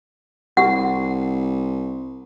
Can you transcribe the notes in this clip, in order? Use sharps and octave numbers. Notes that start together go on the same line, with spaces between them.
C2 G4 F#5